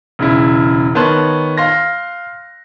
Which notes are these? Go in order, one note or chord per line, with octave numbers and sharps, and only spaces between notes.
E1 C#3 E4
D#3 B3 C#5 A5 C6 F#6
F5 C6 A#6